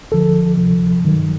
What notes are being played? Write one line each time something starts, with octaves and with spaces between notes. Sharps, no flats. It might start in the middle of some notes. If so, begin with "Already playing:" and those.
D2 D3 F3 A4
D2 C3 F3
G2 D#3 F#3